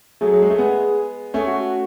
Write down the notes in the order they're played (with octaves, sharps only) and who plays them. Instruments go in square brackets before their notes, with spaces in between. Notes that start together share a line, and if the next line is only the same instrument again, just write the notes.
[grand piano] F#3 A3 [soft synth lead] G#4
[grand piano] F#3
G#3
A3
G#3 B3
[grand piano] A3 C#4 [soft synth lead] G#4
[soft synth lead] F#4
F#4